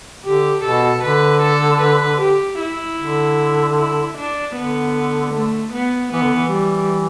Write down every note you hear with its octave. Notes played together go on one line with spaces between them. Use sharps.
D3 G4
B2 A4
D3 B4
A4
B4
G4
E4
D3
E4
D4
D3 B3
A3
B3
E3 B3
D3
E3
G3